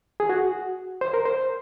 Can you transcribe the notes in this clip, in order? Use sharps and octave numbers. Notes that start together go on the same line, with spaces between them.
G#4
F#4
C5
A#4
C5